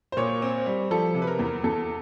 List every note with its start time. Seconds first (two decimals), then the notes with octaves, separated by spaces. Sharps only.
0.12 C5
0.17 A#2 C#5
0.42 C4
0.66 G3
0.91 F3 A4
1.14 C3
1.22 B4
1.27 A#4
1.39 E2
1.64 E2 A4